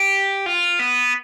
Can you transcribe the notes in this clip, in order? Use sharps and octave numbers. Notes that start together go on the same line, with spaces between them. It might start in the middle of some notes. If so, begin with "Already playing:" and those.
Already playing: G4
F4
B3